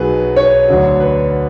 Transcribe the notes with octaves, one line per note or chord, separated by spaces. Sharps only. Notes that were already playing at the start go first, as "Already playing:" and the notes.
Already playing: B1 B2 F#3 G#4 B4
C#5
D2 D3 F#3
B4